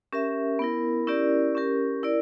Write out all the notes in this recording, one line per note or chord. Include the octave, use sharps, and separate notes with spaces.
C#4 G4 A#4 E5
B3 E4 A#4
C#4 E4 G4 A#4 D5
C#4 G4 A#4
E4 A#4 D5